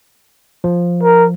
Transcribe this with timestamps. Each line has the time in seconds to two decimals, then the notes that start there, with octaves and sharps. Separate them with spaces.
0.64 F3
1.03 A#4